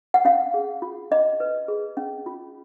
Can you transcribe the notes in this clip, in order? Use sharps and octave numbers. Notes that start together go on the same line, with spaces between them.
F#5
C#4 F5
G#4
F4
C#4 D#5
B4
G#4
C#4
F4